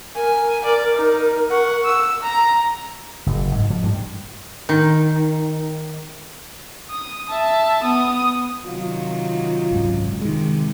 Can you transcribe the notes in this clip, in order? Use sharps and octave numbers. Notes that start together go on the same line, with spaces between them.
A#4 G#5
D5
D#4
F#5 C#6
E6
A#5
F#1
G#2
F3
G2
D#3
D#6
E5 A5
B3 D#6
C3 D#3 F#3 F4
G#1 C#2 F#2
C3 D#3 G#3